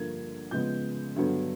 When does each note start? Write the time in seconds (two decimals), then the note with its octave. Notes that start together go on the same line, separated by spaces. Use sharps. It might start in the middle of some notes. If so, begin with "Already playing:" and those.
Already playing: G2 D3 F3 A#3 G#6
0.51 C#3 F3 G#3 B3 G6
1.16 G2 D3 F#3 B3